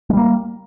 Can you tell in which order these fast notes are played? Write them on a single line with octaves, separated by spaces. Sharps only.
G#3 G3 A#3